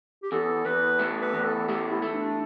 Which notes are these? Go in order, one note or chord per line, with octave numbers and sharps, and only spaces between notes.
G4
E2 A4
E2 B4
A3
B4
E2
A4
A3 G4
G4
E4
A3
E4
D4